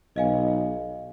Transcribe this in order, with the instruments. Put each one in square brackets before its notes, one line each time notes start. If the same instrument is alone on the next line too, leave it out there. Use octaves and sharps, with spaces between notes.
[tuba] B1 [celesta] D#5 F5 G#5